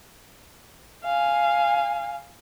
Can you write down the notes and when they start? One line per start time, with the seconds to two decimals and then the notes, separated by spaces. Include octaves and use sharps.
1.04 F5 G#5